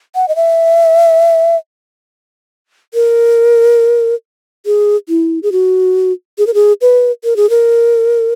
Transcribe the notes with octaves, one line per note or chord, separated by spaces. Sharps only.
F#5
D#5
E5
A#4
G#4
E4
G#4
F#4
G#4
A#4
G#4
B4
A#4
G#4
A#4